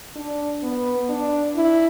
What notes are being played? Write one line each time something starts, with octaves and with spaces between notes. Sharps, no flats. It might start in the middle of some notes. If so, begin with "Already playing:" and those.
D4
B3
D4
E4